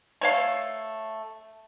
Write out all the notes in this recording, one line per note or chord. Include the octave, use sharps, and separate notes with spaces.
A3 C#5 F5